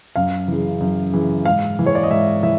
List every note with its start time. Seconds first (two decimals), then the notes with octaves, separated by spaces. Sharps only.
0.16 F#2 F5
0.48 C#3 E3
0.81 F#2
1.13 C#3 E3
1.45 G#2 F5
1.79 E3
1.86 C#5
1.95 D5
2.03 D#5
2.11 G#2 E5
2.43 E3 E5